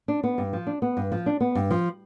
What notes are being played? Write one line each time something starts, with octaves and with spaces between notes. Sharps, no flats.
D4
B3
G2
F3
D4
B3
G2
F3
D4
B3
G2
F3